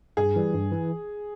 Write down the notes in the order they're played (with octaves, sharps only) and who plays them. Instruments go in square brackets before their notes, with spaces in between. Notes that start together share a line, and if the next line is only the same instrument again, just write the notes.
[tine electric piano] G2 [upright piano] G#4
[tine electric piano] E3 G3
G2
E3